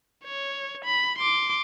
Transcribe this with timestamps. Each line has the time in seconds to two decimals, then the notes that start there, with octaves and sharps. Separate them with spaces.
0.24 C#5
0.85 B5
1.18 C6 D6